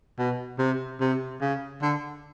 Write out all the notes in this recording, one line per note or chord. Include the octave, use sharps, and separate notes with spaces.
B2
C3
C3
C#3
D3